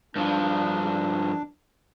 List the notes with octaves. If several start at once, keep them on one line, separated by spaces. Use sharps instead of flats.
G2 F3 D4